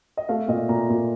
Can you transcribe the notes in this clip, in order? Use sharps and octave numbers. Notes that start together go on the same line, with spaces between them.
D#5
A3 F5
A#2 D#5
A#2 A#5
A#2